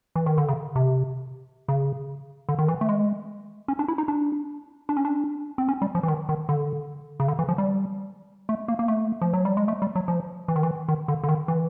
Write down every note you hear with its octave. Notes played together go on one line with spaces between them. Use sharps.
E3
D#3
D3
C#3
C3
C#3
D3
D#3
E3
A3
G#3
C#4
D4
E4
D#4
D4
D4
C#4
D4
C4
C#4
G3
F3
E3
D#3
D#3
D3
C#3
D3
E3
F3
G3
A3
A#3
A#3
A3
F3
F#3
G3
G#3
A3
G3
F#3
F3
E3
D#3
E3
D#3
D3
D3
D#3
E3